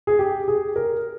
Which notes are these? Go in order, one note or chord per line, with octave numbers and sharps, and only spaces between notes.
G#4
G4
G#4
A#4